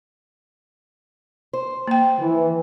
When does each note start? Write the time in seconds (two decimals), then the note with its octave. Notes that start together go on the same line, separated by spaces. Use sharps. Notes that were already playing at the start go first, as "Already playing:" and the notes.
1.53 C5
1.87 A#3 G5
2.19 E3